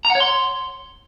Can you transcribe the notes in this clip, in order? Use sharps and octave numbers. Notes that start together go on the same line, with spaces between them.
A#5
F#5
C#5
C6